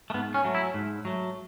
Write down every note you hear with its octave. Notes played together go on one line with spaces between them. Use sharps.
A3
G#2 B3
C#4
F#3 A3
E4
G#2
F#3 A3